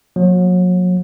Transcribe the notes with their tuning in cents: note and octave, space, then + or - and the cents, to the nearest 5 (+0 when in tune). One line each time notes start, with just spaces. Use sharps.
F#3 -35 A#3 +0